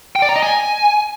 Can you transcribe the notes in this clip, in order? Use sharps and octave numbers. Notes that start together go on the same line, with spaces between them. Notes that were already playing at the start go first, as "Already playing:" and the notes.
G5
D5
A#5
D#5
G#5